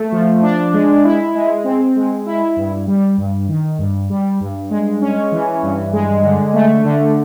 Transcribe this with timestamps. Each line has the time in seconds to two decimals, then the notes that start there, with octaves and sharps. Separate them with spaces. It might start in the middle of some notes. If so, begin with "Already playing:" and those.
Already playing: A3
0.12 F3
0.42 D4
0.73 G#3
1.04 E4
1.35 G#3
1.64 C4
1.96 G#3
2.26 E4
2.57 G2
2.87 G3
3.18 G2
3.48 D#3
3.79 G2
4.10 G3
4.40 G2
4.71 G#3
5.02 C#4
5.32 E3
5.63 G2
5.93 G#3
6.23 D3
6.54 A3
6.85 D3